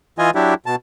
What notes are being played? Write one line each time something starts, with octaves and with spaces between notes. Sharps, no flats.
E3 F4 D#5 G#5
F#3 D4 E4 G4
B2 A5